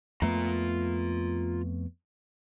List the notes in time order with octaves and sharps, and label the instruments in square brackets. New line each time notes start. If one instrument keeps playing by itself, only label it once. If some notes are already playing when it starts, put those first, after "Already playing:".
[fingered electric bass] F2 A3 B3 [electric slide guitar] F4 A#5